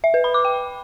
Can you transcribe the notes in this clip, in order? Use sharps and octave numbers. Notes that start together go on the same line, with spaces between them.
E5
B4
B5
D6
G5